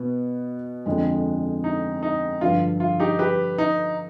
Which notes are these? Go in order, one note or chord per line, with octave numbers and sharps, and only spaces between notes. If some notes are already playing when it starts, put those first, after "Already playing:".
Already playing: B2 B3
F2 D3 G#3
D#4
D#4
G2 D3 F3 F4
F4
D#4 G4
G4 B4
D#4